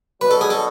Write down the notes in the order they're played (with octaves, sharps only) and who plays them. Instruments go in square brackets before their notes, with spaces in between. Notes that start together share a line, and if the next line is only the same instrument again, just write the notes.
[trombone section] B2 F#3 B3 D4 F#4 [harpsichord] B4
[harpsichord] A4
G#4
A4